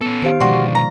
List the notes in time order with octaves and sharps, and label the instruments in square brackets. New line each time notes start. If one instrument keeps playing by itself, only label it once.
[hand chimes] B3 [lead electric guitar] C#4 A4
[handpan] D#3 C5 F5 [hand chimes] G4 D7
[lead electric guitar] B2 D3 [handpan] F3 G#3 D5 [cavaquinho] F#4 C6 [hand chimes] C#6
[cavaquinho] A#5